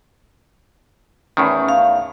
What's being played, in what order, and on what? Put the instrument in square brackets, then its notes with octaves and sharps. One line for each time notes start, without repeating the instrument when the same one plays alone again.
[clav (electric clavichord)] E2 A2 D#3 [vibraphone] C#4
[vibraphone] F5